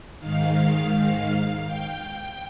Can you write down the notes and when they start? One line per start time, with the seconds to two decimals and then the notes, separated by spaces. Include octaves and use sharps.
0.19 G#2 D#3 F5
1.67 G5